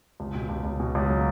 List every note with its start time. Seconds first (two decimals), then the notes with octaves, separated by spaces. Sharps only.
0.20 C#2
0.35 B2
0.49 C#2
0.65 C#2
0.80 B2
0.95 C#2
1.10 F#3